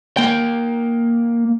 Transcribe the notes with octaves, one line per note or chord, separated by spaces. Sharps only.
A#3 G5